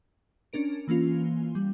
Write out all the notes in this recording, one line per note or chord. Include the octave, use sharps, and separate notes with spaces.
C#4 D4 A#4 D7
E3 A#3 C#4 F4
G3